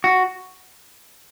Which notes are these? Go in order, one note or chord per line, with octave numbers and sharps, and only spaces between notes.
F#4